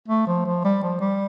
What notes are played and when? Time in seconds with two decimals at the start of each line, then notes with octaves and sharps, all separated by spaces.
0.08 A3
0.27 F3
0.45 F3
0.64 G3
0.83 F3
1.00 G3